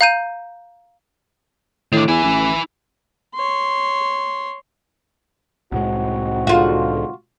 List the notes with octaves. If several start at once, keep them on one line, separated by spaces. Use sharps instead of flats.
F5 A#5 G6 D#7
A2 D#3 D4
E2 E4 G#5
A1
C#5 C6
C2 A2 G#3 C4 D#4 F#4
E2 G#2 D3 F4 F#4